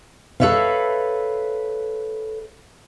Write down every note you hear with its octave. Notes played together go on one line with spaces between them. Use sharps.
A4 B4 C#5 E5 F5